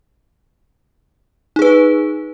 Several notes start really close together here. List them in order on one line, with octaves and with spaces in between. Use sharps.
D#4 G#4 B4